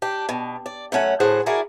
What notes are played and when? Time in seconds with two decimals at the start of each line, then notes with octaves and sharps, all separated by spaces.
0.02 D4 G4
0.29 B2
0.66 D5
0.92 F#2 A3 C#4 F#5
1.20 D2 A2 G#4 C5 F#5
1.46 E4 F#4 G#4 A#4 D5